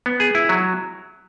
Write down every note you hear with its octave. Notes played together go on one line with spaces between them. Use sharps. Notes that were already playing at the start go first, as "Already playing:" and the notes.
B3
G#4
E4
F#3